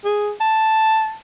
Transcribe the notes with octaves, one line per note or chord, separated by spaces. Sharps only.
G#4
A5